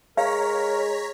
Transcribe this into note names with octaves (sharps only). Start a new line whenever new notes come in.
G#3 A#4 C#5 F5 A#5 B6